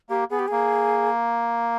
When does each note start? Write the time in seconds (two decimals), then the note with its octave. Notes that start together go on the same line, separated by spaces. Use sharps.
0.09 A#3 G4
0.30 B3 G#4
0.39 G4
0.48 A#3 G#4